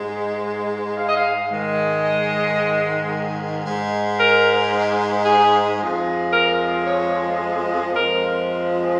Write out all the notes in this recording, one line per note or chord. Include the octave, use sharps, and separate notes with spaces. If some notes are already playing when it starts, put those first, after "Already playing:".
Already playing: G#2 G#3
F5
D#5
F5
G#2 D#3 G#3
D#5
G#2 G#3
A#4
G#4
F2 F3 G#3
A#4
C#5
F2 F3 G#3 A#4